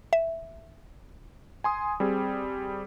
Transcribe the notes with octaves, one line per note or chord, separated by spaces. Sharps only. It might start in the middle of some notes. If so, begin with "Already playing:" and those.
E5
G#5 C6 D#6
G3 C4 G#4